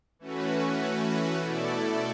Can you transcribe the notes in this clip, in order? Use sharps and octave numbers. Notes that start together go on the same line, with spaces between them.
E3 A3 C#4 F#4 B4
B2 A3 E4 A4 D5